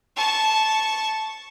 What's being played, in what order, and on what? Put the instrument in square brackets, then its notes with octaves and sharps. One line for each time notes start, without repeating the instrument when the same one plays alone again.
[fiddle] A5 C#6